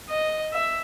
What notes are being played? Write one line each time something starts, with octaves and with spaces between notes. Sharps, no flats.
D#5
E5